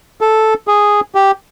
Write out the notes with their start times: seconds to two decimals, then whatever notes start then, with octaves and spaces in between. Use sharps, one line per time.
0.21 A4
0.68 G#4
1.15 G4